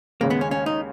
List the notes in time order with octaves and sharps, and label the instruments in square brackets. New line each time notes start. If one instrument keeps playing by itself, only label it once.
[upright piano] D#2 C#3 G#3 [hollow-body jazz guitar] A#3
[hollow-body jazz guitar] B3
C#4
C#4
D#4